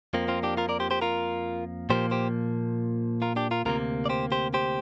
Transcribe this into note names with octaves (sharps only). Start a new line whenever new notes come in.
F2 F3 A#3 C4
C4 F4
D4 G4
F4 A#4
A#4 D5
G4 C5
G4 C5
F4 A#4
A#2 F3 A#3 G4 C5
G4 C5
F4 A#4
D4 G4
F4 A#4
D2 C3 A#3 F4 A#4
D5
G4 C5
G4 C5
G4 C5